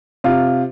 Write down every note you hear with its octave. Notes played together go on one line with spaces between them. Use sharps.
C3 F4